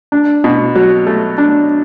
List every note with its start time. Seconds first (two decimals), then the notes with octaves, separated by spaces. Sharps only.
0.12 D4
0.44 B2
0.75 F#3
1.07 A3
1.38 D4